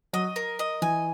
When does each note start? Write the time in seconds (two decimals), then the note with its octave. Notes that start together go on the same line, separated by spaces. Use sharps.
0.13 F#3 D#5
0.36 A#4
0.59 D#5
0.82 E3 G#5